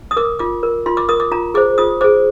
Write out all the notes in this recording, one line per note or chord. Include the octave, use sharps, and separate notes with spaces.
D#6
A#4 D6
F4 D6
A#4
F4 C6
D6
A#4 D#6
D6
F4 A#5
G#4 C5 D6
F4 D#6
G#4 C5 D6